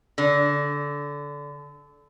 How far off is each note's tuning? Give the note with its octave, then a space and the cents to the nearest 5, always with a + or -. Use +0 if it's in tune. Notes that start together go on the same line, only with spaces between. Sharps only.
D3 -20